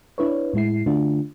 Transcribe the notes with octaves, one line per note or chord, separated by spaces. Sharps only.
D4 E4 B4 C#5
A2 G#3 E4 C7
D3 A3 D4 F4